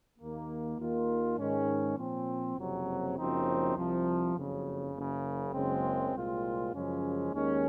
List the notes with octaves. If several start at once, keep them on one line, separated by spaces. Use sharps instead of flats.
D#2 D#3 A#3
D#2 D#3 A#3 F4
G#2 D#3 G#3 C#4
A#2 F3 C4
F#1 F2 C3 F#3
F#1 F#2 F3 C4 D#4
C2 C3 F3
F#1 F2 C#3 F#3
F#1 F#2 C#3
F#1 F#2 C#3 G#3 C4
C2 A#2 G#3 C4 F4
F#2 C#3 F3 G#3 C#4
D#2 D#3 G#3 C#4